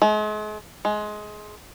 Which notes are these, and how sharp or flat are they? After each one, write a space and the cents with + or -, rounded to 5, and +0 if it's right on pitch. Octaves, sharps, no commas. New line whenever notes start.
G#3 +40
G#3 +20